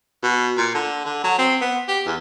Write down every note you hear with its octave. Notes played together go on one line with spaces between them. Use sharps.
B2
A#2
D3
D3
F#3
C4
B3
G4
E2